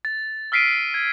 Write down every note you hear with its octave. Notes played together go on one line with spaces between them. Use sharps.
A6
E6 F6 B6 C7 D7 D#7
G#6